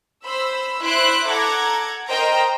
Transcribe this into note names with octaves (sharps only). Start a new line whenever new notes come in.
C5 B5 E6
E4 C5 E5 C6 F#6 D7
A4 F#5 A#5 D6 G#6
A#4 C5 D#5 G5 A#5